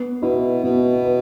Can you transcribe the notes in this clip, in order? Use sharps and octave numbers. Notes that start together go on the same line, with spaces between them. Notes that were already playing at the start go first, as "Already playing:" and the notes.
Already playing: B3
B2 E4 B4
B2 B3
B4